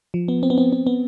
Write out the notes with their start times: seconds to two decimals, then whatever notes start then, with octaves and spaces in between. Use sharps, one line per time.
0.14 F3
0.28 B3
0.43 C4
0.50 B3
0.58 C4
0.72 C4
0.87 B3